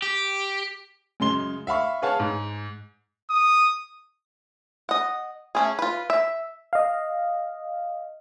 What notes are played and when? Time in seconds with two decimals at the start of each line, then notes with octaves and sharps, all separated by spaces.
0.02 G4
1.20 F#2 C#3 G#3 C6 G7
1.67 E5 F5 B5 C#6
2.02 G#4 B4 C#5 F5 A5
2.20 G#2
3.30 D#6
4.89 D#5 F#5
5.55 A3 C#4 G#4
5.79 F4 B4
6.10 E5
6.73 D#5 F5